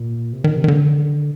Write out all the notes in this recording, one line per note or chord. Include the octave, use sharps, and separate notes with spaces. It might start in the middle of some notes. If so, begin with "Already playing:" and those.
Already playing: A#2
C3
D#3
C3
D#3
D3